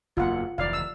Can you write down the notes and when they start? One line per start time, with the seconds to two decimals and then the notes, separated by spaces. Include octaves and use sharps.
0.17 F#1 E2 A#3 F4 F#5
0.58 F1 D2 E3 D5 F5
0.73 E6